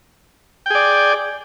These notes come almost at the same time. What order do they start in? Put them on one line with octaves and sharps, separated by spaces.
G5 G#4 D5